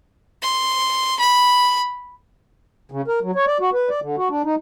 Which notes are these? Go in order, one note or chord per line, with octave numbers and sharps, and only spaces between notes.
C6
B5
C#3
A#4
F#3
C#5
D5
F#4
B4
D5
D3
F#4
D4
D#4